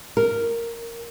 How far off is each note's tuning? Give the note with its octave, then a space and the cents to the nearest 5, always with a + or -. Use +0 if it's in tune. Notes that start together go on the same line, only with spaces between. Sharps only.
A#4 -5